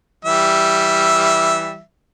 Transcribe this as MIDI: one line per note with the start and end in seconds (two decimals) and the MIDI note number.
0.25 1.80 52
0.25 1.80 55
0.25 1.80 76